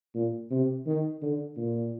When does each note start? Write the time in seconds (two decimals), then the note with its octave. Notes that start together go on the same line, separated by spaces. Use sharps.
0.15 A#2
0.51 C3
0.86 D#3
1.22 D3
1.57 A#2